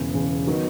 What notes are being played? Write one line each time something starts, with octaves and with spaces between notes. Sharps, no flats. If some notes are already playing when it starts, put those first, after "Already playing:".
Already playing: E1 E2 C#3
E1 E2 C#3
D#3 F#3 B3